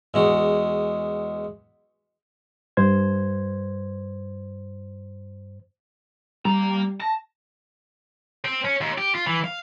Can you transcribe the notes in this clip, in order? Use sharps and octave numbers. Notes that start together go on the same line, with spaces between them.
E2 G#3 F#4
G2 C5 G#6
G3 A#3 A#5
A5 A#6
C4
C#4
D#2
G4
F4
E3
F5